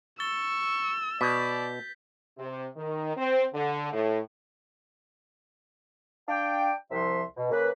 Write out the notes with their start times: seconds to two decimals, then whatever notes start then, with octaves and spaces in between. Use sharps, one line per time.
0.20 C#6 E6 A6 G7
1.21 B2 D5 G6 B6
2.38 C3
2.77 D#3
3.17 C4
3.54 D3
3.93 A2
6.28 D4 F5 G5
6.91 C2 C3 F3 E5 C6
7.37 B2
7.51 C#3 A#3 B4